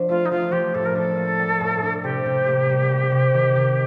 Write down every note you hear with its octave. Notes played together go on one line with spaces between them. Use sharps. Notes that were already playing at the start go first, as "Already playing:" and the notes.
Already playing: F3 D4
A3 F4
D#4
F3 F4
F3 G4
A2 A4
A#4
D4 A4
A#3
G3
A2
D4
C3 G4
C3
A#3
G3
C3
C3
D#3
D#3